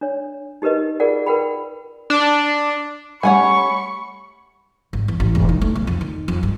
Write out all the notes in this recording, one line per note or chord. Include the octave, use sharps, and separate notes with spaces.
D4 C#5
D#4 G4 A#4 B4 D#5
F4 G#4 A#4 D5 F#5
A#4 B4 F#5 G5 B5
D4
G3 A3 C#4 C#5 F#5 G#5 B5 C#6
G#1
E2
A1
E1
D#3
A3
B1
F2
D#3
F2
G2